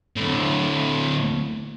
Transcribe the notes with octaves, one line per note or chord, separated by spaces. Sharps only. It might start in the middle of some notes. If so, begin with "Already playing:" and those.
D2 A2